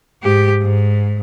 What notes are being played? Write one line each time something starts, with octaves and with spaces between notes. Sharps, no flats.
G#2 G4
G#2